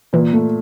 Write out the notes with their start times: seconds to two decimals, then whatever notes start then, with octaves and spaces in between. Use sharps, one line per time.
0.13 A#2 E3
0.33 A3